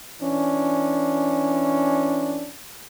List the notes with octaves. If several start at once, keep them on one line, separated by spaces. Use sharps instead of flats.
E3 C#4 D4